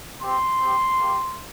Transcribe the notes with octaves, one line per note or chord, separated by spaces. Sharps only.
C4 G4 C6
C4 G4
A#3 G4